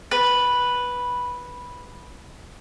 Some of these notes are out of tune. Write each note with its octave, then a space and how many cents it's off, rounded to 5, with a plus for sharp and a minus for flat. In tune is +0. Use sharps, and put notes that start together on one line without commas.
B4 -5